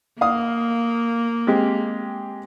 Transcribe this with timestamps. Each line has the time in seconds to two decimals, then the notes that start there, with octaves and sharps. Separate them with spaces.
0.21 A#3 F5 D#6
1.47 G#3 C4 G4